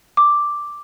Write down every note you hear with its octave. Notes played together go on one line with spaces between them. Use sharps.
D6